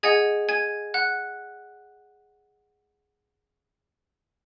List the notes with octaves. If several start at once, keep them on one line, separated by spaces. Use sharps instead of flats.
G#4 D#5 F#5 G#5 G#6
G#5 G#6
F#5 F#6